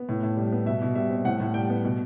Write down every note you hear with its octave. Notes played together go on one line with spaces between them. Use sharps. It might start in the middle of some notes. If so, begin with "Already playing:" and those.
Already playing: B3
A2
A2
G3
B3
B2 E5
B2
G3 E5
C4
A2 F#5
A2
G3 G5
B3
B2